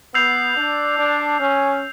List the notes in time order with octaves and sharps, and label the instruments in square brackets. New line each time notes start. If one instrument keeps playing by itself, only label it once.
[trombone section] B3 [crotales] E6 G6 C7 F7
[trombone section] D4
D4
C#4